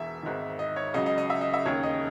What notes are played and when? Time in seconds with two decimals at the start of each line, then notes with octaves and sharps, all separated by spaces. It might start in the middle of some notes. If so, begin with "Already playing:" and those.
Already playing: E1 E2 E5
0.23 G#1 G#2 D#3
0.59 D#5
0.76 C#5
0.94 C#2 C#3 F#3 D#5
1.06 D#5
1.18 D#5
1.30 E5
1.41 D#5
1.54 E5
1.65 E1 D#2 C#3 C#5
1.83 D#5